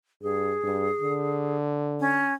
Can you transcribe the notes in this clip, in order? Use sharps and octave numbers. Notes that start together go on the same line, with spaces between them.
G2 G#4
G2
D3
C#4